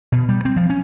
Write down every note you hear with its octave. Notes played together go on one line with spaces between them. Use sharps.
B2
G3
C4
F3
C#4